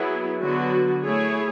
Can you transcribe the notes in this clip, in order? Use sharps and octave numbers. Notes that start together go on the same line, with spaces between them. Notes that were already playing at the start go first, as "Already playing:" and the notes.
Already playing: F#3 B3 E4 G#4
D3 F#3 B3 F#4
A3 E4 G#4 C#5